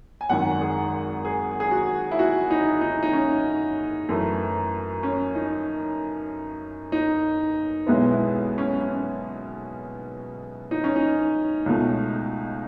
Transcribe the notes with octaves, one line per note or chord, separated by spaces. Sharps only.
G#5
G#1 F#2 D#3 F#5
G#4
G#4
G#4
F#4
E4
F#4
D#4
D#4
D#4
C#4
F#2 E3 A3
C#4
D#4
D#4
B1 B2 G#3 B3 E4
E4
C#4
C#4
D#4
C#4
D#4
C#2 B2 A3